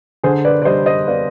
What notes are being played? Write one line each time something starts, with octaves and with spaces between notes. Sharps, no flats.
D3 G#4 C5
B4 D5
D5
G3 C5 D#5
C5 D#5
B3 D5 F5